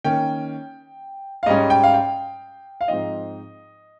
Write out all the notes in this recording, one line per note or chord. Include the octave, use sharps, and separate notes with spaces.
D#3 A#3 C#4 G5
F5
G#2 G3 C#4 D#5
G5
F5
G5
F5
G#2 F3 C4 D#4 D#5